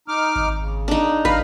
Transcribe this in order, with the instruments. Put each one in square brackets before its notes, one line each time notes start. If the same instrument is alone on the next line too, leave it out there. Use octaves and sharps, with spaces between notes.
[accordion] D#4 D6 F6
[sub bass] G#1
[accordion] C#3
[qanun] D4 D#4
[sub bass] G#1 [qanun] B4 [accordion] F5 A#5 F6